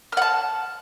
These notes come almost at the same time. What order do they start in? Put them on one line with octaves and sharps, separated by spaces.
F6 F#5 A5